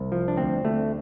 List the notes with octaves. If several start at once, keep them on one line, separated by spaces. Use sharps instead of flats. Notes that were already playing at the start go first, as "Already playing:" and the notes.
Already playing: C2
F3
D4
D2 C4
D2 A3